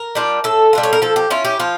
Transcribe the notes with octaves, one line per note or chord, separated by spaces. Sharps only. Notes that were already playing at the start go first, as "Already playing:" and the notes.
Already playing: A#4
G3 D4 F4
A2 A4
G3 D4 F4
C#5
A#4
F3 A4
G4
C#4 E4 F4
G4
F3 F4